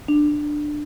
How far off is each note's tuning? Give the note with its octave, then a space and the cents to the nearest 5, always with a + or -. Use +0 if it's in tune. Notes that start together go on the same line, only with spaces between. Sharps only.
D4 +15